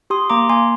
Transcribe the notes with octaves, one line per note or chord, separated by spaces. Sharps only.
G4 C6 D#6
A#3 A#5 D6
A#3 G#5 C6